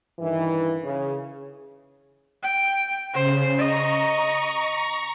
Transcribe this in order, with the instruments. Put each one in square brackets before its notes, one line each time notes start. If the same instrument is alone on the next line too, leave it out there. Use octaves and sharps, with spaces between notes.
[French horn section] G2 D#3 E3
C#3
[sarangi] G5
[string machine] C#3 [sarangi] C5
[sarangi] D#5 [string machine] A#5 C#6